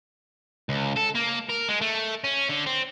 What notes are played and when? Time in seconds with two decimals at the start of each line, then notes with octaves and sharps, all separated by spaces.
0.69 C#2
0.96 A4
1.15 A#3
1.50 A#4
1.69 G#3
1.81 A3
2.24 C#4
2.49 D3
2.66 C4